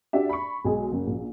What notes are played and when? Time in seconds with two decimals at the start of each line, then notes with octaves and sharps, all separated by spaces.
0.13 D4 F#4 G4 D5 E5
0.29 B5 C#6
0.65 B1 G#3 G#4
0.92 F#1
1.07 A#1